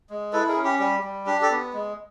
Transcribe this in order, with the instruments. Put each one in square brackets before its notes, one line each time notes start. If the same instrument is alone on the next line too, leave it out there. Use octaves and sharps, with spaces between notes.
[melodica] G#3
E4 A4 B4
G#4 A#4
C#4
G4
G3 G4
G3
D4 G4
G4 A4
B3
G#3